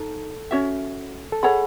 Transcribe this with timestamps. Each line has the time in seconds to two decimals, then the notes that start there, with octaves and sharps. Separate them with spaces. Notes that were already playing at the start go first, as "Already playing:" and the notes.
Already playing: D#4 A4
0.51 C#4 F#4 C#5 E5
1.32 A4
1.43 G#4 A4 C#5 F#5 B5